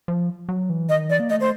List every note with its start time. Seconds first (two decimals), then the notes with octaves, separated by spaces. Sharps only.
0.08 F3
0.49 F#3
0.70 E3
0.89 D#3 D#5
1.09 E3 D5
1.20 A#3
1.30 A3 D#5
1.40 C5